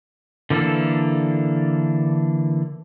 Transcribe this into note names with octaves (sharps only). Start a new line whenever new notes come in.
D3 E3 A#3 D4 A4